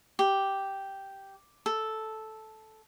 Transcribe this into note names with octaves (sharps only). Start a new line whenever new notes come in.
G4
A4